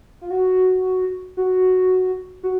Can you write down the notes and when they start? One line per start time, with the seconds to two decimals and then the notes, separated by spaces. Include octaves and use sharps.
0.21 F4
0.30 F#4
1.37 F#4
2.43 F#4